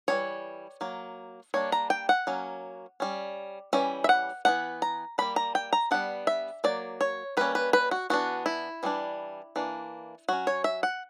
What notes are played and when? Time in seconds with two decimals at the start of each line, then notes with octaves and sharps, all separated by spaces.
0.08 E3 G3 C#4 C#5
0.81 F#3 A#3
1.54 G3 A#3 D4 C#5
1.72 A#5
1.90 G5
2.09 F#5
2.27 F#3 A#3 C#4
3.00 G3 C#4
3.73 E3 G3 C#4 E5
4.04 E5
4.09 F#5
4.45 E3 B3 D4 F#5
4.82 A#5
5.18 G3 A#3 D4 B5
5.36 A#5
5.55 G5
5.73 A#5
5.91 G3 B3 D4 F#5
6.27 E5
6.64 F#3 A#3 D5
7.01 C#5
7.37 G3 A#3 C#4 B4
7.55 B4
7.73 B4
7.91 F#4
8.10 E3 B3 D4 F#4
8.46 E4
8.83 E3 G3 B3 D4
9.56 E3 A#3 D4
10.29 F#3 C#4 F#4
10.47 C#5
10.64 E5
10.83 F#5